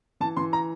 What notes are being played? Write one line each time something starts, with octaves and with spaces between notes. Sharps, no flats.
E3 A5
E3 C6
A#5